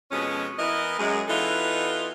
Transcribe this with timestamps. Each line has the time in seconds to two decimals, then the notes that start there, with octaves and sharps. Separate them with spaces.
0.11 F2 B2 G#3 C#4
0.58 E3 B3 E4 A#4 D#5
0.99 F#2 G#3
1.28 E3 B3 D#4 F4 F#4 A4